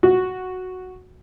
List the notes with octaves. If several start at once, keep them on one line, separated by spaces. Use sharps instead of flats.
F#4